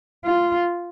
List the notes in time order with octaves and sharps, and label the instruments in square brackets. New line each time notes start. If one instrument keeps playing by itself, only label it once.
[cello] F4